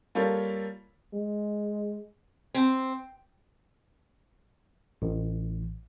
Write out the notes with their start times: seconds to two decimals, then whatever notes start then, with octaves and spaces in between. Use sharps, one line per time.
0.15 G3 A#3 F4 A4 A#4 C#5
1.13 G#3
2.54 C4
5.02 A1